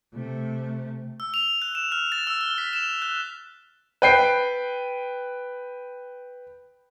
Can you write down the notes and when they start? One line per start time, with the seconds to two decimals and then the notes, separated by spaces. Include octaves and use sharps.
0.14 C3 A3
1.20 E6
1.34 F7
1.62 F#6
1.75 E7
1.92 F6
2.12 A6
2.27 E6
2.41 G7
2.58 B6
2.73 E7
3.02 F#6
4.02 B4 G5 C7